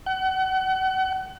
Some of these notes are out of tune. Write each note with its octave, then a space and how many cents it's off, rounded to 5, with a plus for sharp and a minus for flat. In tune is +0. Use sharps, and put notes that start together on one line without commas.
F#5 +35